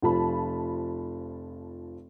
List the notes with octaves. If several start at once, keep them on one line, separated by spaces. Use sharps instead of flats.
F1 F3 A5 B5